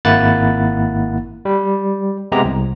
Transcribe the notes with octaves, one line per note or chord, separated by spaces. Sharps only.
G#1 A#3 E4 F#5 F#6 A6
G3
C3 G#3 B3 G4 A#5
C2